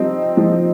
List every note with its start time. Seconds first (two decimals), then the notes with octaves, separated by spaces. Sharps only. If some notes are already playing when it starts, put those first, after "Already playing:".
Already playing: F3 G3 C4 D#4
0.37 F3